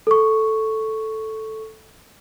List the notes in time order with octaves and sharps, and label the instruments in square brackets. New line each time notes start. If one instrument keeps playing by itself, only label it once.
[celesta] A4 C#6